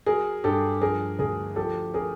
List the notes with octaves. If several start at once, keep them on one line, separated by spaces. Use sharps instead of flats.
F#3 G#4 A#4
G2 G4 A4
F3 G#4 A#4
D2 G#4 A#4
F3 G4 A4
G#4 A#4